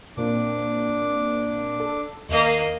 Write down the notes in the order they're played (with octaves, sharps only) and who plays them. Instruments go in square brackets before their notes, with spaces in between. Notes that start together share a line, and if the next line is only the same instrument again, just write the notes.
[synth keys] A#2 A#3 C4 [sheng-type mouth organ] D4 D6
[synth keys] A4
[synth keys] D#2 E7 [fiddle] A#3 D#5